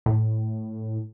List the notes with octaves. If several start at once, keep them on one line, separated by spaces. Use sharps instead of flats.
A2